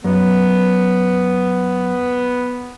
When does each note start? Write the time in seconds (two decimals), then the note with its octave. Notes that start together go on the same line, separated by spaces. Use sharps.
0.04 F#2 B3